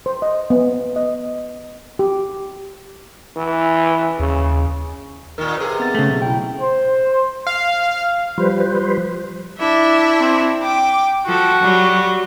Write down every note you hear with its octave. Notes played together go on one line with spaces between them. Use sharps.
C5
D#5
B3
D#5
G4
E3
D#2 C#3
A#2 D#3 A#4
C3 G#4 B4
B3 C4 A6
C#3 A3
B1
E4 G5
C5
F5
F3 G3 B4 C5
D4 E4 E5
C4
G5 D6
F3 F#4 A4
F#3 G3